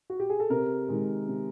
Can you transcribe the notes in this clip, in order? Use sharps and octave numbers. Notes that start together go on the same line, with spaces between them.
F#4
G4
G#4
A4
C3 A#4
D#3 G#3
C3